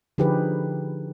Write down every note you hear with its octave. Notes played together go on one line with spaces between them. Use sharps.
D3 F3 D#4 G4 G#4 B4